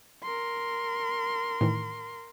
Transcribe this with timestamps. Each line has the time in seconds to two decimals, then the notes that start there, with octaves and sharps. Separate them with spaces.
0.23 A#4 C6
1.61 A2 D#3 E3